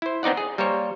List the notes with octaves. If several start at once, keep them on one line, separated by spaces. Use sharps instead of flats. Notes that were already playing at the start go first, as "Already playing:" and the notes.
E4 C5
B3 C4 D#4 D5 F#5
G#4
G3 A#3 A#4 C5 C#5